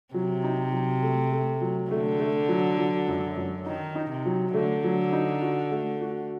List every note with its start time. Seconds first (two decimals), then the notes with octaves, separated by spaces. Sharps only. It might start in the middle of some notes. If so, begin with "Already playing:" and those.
0.14 C3 F#3
0.44 D#4
0.72 F#3
1.02 A3
1.32 A3
1.61 F#3
1.90 D3 A3
2.20 A3
2.49 F#3
2.78 F#3
3.08 F#2
3.37 F#2
3.66 D#3 D#4
3.95 D#4
4.10 C3
4.25 F#3
4.54 D3 A3
4.84 F#3
5.13 D#4
5.42 F#4
5.72 A3
6.01 F#4